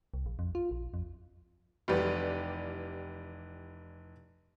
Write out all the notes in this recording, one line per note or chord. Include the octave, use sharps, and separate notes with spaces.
C2
A#1
F2
F4
A#1
F2
F1 E3 G3 G4 B4 D5